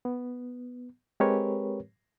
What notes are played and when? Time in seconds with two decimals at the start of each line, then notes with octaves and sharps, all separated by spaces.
0.05 B3
1.20 G#3 C4 G4 A#4 B4 C#5